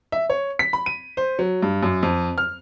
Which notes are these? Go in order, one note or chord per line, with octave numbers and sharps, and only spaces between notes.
E5
C#5
B6
B5
D#7
C5
F#3
G2
F#2
F2
F6